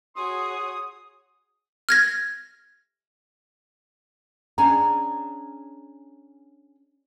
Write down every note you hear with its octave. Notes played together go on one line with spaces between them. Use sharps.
F#4 G#4 C#5 C6 D#6
F6 G#6 A#6
C#4 D4 G#4 A#5